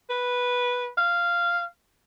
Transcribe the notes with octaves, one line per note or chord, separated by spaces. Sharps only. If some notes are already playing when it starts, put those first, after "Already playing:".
B4
F5